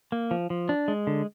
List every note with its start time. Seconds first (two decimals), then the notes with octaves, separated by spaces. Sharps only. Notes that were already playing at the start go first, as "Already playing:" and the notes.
0.12 A#3
0.31 F3
0.50 F3
0.69 D4
0.88 G#3
1.07 D3